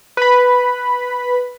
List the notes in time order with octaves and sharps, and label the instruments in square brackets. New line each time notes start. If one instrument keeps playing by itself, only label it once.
[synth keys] B4 B5